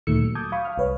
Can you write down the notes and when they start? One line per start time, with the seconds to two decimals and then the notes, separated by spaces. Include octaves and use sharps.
0.07 D2 A#2 D#3 A3 E6 C#7
0.23 F#3
0.35 A5 D6 D#6 G6 G#6
0.52 F5 B5 C#6 D#6
0.65 F5 F6
0.78 C2 B4 C#5